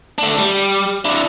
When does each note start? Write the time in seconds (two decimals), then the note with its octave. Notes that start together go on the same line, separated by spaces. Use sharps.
0.18 A3 D4
0.39 G3
1.05 D4 E4